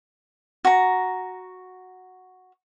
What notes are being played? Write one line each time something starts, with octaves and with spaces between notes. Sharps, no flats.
F#4 A#5